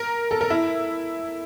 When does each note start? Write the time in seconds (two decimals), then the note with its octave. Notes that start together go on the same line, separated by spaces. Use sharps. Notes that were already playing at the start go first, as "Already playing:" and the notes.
Already playing: A#4
0.31 A4
0.41 A#4
0.50 E4